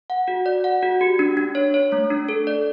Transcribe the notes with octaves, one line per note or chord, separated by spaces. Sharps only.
F#5
F#4
D5
F#5
F#4
G4
D4
D4
C#5
C#5
A3
D4
A4
D5